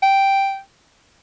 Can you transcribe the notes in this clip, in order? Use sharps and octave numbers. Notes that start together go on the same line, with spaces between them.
G5